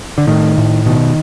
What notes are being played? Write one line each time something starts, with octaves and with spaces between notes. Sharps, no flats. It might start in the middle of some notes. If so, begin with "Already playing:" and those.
D3
A2 D#3
A2
B2 D#3